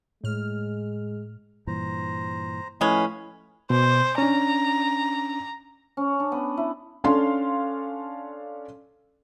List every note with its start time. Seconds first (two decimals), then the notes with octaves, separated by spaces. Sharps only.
0.24 A2 G#3 F6
1.67 G2 A#2 E3 C5 A#5
2.81 A2 F3 G#3 C#4 B4 F5 B5
3.70 B2 C5
4.18 C#4 D4 A#5
5.97 C#4
6.20 D4
6.32 B3
6.57 E4
7.04 C#4 D4 A4 F5 C6